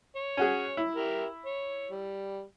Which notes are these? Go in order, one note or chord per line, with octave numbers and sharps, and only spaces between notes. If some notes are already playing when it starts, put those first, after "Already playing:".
C#5
C#4 F#4 G#4
E4
G4 A#4 E5
C#5
G3